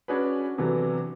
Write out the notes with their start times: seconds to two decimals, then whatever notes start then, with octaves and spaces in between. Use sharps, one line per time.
0.08 C#4 D4 F#4 G#4 B4
0.58 C3 E3 F#3 B3 D4 A4